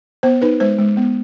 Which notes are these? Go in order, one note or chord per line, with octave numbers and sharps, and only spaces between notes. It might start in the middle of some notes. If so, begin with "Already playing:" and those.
B3 C5
D#4 B4
G#3 C5
G#3
B3